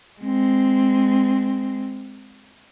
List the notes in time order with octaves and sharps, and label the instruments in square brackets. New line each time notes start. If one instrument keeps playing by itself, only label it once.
[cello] G#3 C4